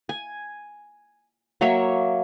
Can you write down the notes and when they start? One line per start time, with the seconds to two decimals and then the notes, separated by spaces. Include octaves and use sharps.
0.09 G#5
1.61 F#3 A#3 C#5 E5